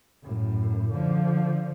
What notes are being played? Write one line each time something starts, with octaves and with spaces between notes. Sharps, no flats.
F#2 A2
D3 F3